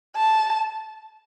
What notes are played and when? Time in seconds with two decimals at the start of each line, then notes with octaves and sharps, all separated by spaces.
0.16 A5